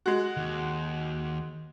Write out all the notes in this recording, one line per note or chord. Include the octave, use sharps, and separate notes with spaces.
G#3 F#4
D#2